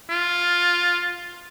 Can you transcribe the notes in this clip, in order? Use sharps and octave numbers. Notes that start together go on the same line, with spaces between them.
F4